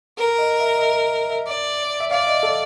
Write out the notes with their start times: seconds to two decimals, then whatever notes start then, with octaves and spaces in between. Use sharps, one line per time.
0.18 A4 A#4
0.39 D#5
0.60 E5
0.78 D#5
0.82 E5
1.30 E5
1.47 D5
2.00 E5
2.11 D5 F5
2.27 D#5
2.43 A4